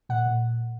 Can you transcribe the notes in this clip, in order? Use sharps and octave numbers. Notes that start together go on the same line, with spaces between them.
A#2 F#5
A#2